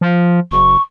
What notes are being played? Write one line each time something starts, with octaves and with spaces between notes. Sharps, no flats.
F3
F#1 C#6